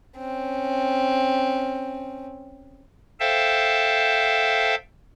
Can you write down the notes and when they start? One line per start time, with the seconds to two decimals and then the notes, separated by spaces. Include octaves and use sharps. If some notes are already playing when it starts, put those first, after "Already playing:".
0.17 C4 C#4
3.20 A4 C5 E5 F5 G5 A5